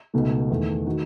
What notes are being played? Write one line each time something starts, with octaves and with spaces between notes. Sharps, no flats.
C#2 B2 A3 D#4
E2 D#3 A3
D#3 A3 D#4 F#4